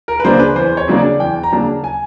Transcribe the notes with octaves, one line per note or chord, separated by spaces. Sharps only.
A#4
B4
C#3 F#3 A#3 D4 C5
B4
E2 C5
C#5
C#3 F#3 A#3 D4
D5
E2 G5
A#5
C#3 F#3 A#3 D4 A5
G#5